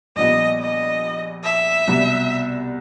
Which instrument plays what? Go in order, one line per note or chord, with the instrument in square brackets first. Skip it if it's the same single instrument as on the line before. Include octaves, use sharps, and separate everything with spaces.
[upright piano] A#1 A#2 G3 B3 [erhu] D#5
[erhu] D#5
E5
[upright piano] C2 B2 G3 B3